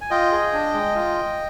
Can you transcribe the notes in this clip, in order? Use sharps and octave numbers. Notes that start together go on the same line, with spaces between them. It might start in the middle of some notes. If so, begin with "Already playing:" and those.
G#5
F4 D#5 G5
G#4
D4
G#3
F4